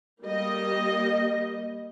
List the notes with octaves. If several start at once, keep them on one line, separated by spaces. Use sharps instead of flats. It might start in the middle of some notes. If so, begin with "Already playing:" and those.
G3 A#3 D#5